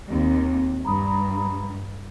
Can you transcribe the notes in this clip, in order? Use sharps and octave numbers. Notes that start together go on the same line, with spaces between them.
D#2 C4
G2 A#5 B5 D#6